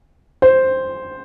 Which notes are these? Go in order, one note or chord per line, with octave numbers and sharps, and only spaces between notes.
C5